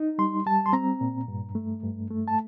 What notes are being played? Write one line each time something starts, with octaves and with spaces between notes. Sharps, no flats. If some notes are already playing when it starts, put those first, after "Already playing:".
Already playing: D#4
G3 C6
G3 A5
C6
C4 A#5
A#2
G2
A3
G2
A3
A5